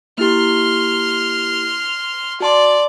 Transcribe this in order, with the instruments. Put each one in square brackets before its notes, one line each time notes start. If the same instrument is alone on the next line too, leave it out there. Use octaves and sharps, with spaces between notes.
[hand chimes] A#3 E4 G4 [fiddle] C6 F6
[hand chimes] F#4 A5 C6 [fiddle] D5